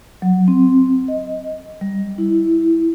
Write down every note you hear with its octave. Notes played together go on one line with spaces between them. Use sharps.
F#3
C4
D#5
G3
E4